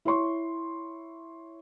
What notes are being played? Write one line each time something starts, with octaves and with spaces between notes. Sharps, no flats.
E4 C#5 C6 C#6